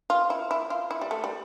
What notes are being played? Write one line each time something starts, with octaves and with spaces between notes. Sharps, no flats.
F4
E4
E4
F4
E4
G3
A3
G3